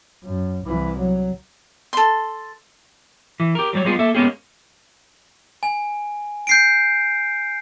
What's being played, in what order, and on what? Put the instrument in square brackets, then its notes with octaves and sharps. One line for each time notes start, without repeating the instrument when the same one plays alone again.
[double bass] F#2
C2 E3
F#3
[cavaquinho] A4 C6
[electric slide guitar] E3
G4 A#4
F#3 G3 C#5
G3 G#3 B3 F4 G#4
A#3 A4 E5
G#3 A#3 B3 C#4 G4 G#4
[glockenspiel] G#5
G6 C7 D7